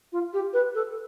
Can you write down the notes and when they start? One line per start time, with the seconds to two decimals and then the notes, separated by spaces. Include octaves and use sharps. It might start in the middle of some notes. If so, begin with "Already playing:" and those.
0.12 F4
0.33 G4
0.53 B4
0.75 A4